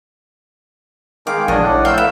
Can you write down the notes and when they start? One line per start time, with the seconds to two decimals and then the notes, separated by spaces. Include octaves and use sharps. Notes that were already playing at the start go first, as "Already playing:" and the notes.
1.27 D#3 G#3 F5 G5 D6
1.48 A#1 A#3 D4 C#5 D#5 F#5 A5
1.63 A2 D5 F#5
1.85 A3 C4 A#4 F5 E6 G6
1.98 B4 E5